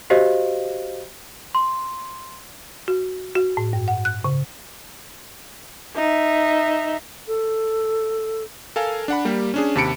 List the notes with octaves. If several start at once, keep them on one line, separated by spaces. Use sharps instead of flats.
F#4 G4 C5 D#5 F5
C6
F#4
F#4
A2
G2
F#5
F#6
C#3
D#4 E5
A4
A4 A#4 F5 G#5
D4 F#5 B5
G3 A#3 G4
C#4 D4 G#4
D#2 C3 A5 B5 C#7 D7